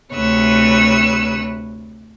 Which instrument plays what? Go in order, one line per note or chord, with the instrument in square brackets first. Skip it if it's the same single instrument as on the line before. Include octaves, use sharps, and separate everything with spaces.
[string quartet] D2 C3 B4 C#5 E6